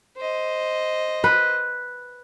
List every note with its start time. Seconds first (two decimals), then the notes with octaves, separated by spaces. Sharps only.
0.17 C5 D#5
1.24 B4